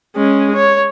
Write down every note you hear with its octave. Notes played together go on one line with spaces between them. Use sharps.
G#3 C#4
C#5